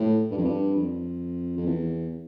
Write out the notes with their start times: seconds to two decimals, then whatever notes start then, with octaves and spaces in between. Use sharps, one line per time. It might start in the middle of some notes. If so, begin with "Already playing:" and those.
Already playing: A2
0.31 G2
0.37 F2
0.44 G2
0.76 F2
1.57 F2
1.66 E2